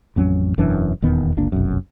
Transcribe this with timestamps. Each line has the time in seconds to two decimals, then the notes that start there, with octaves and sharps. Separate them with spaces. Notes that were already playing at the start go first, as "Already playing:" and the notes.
0.16 A1 F2 F#3 C#4
0.58 E1 F#2 E3 D4
1.02 D#1 E2 D#3 B3
1.37 G1 C#2 A#3 D4
1.52 F1 B1 F#2